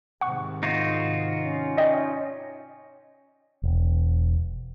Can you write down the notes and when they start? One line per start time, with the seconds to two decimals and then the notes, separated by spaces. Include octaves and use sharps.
0.21 G#2 C3 D#3 F#5 C#6
0.63 D#4 F4 F#4
1.45 C#4
1.77 D5 D#5 G5
3.63 E1